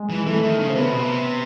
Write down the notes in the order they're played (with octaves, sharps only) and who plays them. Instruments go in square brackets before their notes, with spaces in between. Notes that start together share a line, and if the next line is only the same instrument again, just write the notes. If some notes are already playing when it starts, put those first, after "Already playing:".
Already playing: [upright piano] G#3
[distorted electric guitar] E3
[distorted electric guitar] E3 [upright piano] A3
[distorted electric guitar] D#3
C#3
[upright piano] C4
[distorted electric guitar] C3 [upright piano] B3
[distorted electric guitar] B2
C3